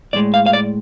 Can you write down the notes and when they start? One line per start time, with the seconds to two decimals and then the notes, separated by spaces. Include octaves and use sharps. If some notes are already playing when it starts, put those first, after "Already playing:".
0.13 A2 G#3 D5
0.34 F5
0.46 F5
0.53 D5